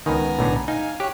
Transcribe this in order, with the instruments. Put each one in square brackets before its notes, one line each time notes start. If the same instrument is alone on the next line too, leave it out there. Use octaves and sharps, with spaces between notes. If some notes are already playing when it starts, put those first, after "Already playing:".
[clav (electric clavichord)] C#2 D#3 [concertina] B3 G#5 A#5
[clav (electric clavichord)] B1 A2 D3
[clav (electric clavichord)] D#4 [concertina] F5 G#5
[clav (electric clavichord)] G4 [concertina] C#5 F#6